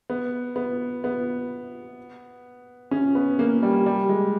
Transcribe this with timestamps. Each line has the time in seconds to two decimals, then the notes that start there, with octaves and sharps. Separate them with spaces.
0.10 B3
0.56 B3
1.04 B3
2.91 C#4
3.15 B3
3.39 A#3
3.63 G3
3.86 G3
4.09 G#3